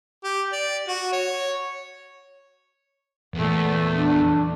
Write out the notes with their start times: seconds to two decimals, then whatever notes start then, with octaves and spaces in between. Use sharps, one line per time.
0.24 G4
0.52 D5
0.88 F#4
1.12 C#5
3.34 E2 A#2 A3
3.93 D4